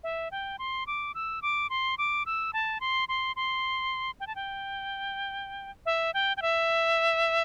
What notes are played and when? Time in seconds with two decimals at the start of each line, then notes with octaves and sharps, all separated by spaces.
0.04 E5
0.32 G5
0.59 C6
0.87 D6
1.15 E6
1.42 D6
1.70 C6
1.98 D6
2.26 E6
2.53 A5
2.81 C6
3.09 C6
3.36 C6
4.20 G5
4.27 A5
4.36 G5
5.86 E5
6.14 G5
6.37 G5
6.42 E5